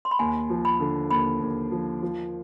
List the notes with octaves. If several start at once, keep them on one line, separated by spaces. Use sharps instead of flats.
C6
B5
D#2 G#5
F3
B5
D3
D#2 B5
D#2
F3
F3